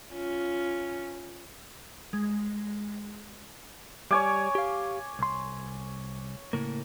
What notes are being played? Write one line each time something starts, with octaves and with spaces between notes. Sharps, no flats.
C#4 F4
G#3
G3 C#5 G#5 D6
G4 F5
C2 C6
A2 C#3 A#3